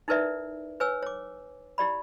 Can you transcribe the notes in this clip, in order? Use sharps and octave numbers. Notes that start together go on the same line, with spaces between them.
D#4 E4 A#4 B4 D5 E5
B4 C#5 G#5 E6
C#5 D6
E4 G4 D5 B5